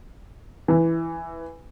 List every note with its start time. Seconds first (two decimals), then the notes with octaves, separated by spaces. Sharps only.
0.68 E3